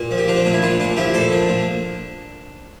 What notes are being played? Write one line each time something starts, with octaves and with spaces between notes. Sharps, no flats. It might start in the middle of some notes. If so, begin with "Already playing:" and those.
Already playing: A#2
F3
G4
F3 D4 F4
C4
A#2 D4
E4
A#2 D4 F4
A#2 D4 F4
F3 E4 G4
A#2 A4 C5
F3 D4
A#2